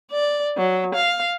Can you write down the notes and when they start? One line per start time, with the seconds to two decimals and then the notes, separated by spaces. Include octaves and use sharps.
0.12 D5
0.57 F#3
0.95 F5